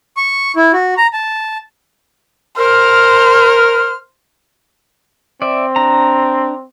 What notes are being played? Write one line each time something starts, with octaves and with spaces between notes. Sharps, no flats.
C#6
E4
F#4
A#5
A5
A#4 C5 F6
C4 D5 E5
D4 A#5